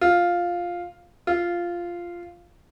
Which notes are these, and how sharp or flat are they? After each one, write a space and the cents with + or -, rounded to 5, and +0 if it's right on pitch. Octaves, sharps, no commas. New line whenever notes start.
F4 +5
F4 -5